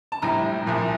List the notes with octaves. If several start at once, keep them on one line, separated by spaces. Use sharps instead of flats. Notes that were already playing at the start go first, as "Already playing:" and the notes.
A5
A#1 A2 G3 A#5
C2 A#2 F3